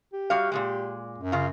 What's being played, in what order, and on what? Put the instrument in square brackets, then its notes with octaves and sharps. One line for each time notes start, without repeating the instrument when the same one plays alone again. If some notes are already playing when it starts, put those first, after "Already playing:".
[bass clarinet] G4
[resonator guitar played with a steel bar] G3 F#4 F5
A#2 C#3 G#3
[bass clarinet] F#2
[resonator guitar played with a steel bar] C#3 F4